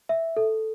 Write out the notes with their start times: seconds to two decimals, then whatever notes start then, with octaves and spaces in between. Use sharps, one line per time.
0.09 E5
0.37 A4